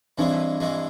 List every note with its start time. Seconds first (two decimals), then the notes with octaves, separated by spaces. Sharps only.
0.18 G2 E3 G#3 C4 D4
0.60 G2 E3 G#3